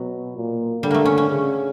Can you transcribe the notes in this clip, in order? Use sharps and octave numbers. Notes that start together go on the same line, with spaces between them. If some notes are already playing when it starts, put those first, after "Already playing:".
Already playing: B2 F#3
A#2
D3 G3
A3 A#3
C#4
C#4
C#3